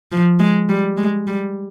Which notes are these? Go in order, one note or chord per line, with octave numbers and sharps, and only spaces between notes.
F3
G#3
G3
G#3
G3